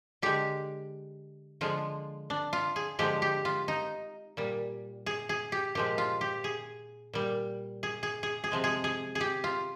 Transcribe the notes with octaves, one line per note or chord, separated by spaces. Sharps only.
D3 G#3 G4
D3 F3 G#3 F4
D4
F4
G#4
D3 F3 G#3 G4
G4
F4
D#4
A#2 G3
G#4
G#4
G4
A#2 F3 G#3 G4
F4
G4
G#4
A#2 G3
G#4
G#4
G#4
G#4
C3 F3 G#3
G#4
G#4
G#4
G4
F4